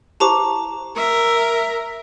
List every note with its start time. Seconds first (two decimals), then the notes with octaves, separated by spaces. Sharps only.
0.20 E4 G4 C5 A5 A#5 D6
0.96 A#4 E5